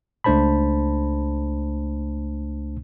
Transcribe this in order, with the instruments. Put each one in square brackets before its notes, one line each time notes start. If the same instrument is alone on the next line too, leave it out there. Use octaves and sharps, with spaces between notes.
[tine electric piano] C#2 A3 D4 C5 A5 B5